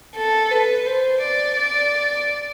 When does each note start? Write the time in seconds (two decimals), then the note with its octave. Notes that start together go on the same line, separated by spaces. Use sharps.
0.16 A4
0.51 B4
0.86 C5
1.21 D5
1.56 D5